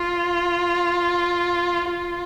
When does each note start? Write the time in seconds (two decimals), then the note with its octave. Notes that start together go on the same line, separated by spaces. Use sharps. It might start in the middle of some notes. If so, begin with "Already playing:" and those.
Already playing: F4
1.90 F4